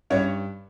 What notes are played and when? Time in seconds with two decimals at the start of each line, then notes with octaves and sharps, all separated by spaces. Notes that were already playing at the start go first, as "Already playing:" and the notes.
0.10 G2 C#4 C#5